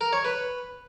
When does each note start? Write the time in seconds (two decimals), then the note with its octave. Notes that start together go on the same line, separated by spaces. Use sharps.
0.01 A#4
0.13 C#5
0.25 B4